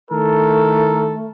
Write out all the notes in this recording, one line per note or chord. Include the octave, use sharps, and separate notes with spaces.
D#3 A3 E4 A4 A#4